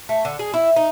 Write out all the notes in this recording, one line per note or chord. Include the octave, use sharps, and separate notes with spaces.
A3
D3
G#4
E4
D#4